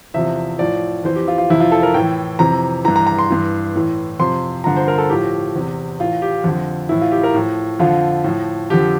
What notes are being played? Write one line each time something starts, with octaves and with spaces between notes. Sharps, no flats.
E2 C3 F3 E5
A2 F3 D5
F2 E3 C5
G4
F4
F4
F2 C3 E3 E4
F4
A4
A#4
A2 E3 G5
F2 C3 E3 A#5
G2 E3 A#5
A#5
A#5
C6
G2 E3
A2 E3
F2 C3 F3 C6
G2 D3 F3 A#5
C5
A#4
A4
A2 F3 G4
E2 C3 E3
A2 E3 F4
G4
F2 D3 F3
A2 E3 E4
F4
G4
A#4
A2 F3
F2 D3 F3 F4
A2 F3
F2 D3 F3 G4